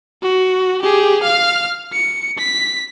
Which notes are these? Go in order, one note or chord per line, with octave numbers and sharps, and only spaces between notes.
F#4
G4 G#4
F5 F6
C#7
B6